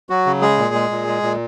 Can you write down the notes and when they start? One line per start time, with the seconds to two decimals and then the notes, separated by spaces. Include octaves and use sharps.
0.10 F#3 F#4
0.26 C#3
0.42 G#3 G#4
0.58 A#2
0.75 G#3
0.91 A#2
1.07 G#3
1.23 A#2